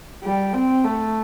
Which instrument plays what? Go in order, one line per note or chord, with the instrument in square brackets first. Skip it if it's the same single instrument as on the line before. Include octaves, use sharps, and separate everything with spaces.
[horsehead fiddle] G3
C4
A3